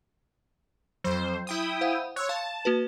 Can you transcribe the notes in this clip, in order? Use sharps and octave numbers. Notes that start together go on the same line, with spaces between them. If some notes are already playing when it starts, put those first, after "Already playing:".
F2 F#3 C5
E4 G5 D#6
C5 F5 F#5
C#5 C6 E6 F#6
F5 A5
A#3 F#4 B4